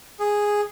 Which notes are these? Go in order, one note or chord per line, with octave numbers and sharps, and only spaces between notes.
G#4